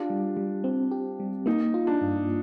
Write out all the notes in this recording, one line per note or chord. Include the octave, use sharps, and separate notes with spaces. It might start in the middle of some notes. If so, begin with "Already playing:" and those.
Already playing: D4 F4 G4
G3
G3
C4
G4
G3
A#3 D#4
F4
D4
G2